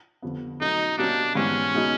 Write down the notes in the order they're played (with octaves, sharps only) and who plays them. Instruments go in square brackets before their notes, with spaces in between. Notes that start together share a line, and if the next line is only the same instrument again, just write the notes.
[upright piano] F2 D3 G3 B3
[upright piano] B2 F#3 A3 C#4 [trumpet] D#4
[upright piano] B2 G3 A#3 C#4 [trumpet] D4
[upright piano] G#2 E3 G3 B3 [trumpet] C#4
[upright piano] B2 G#3 B3 D#4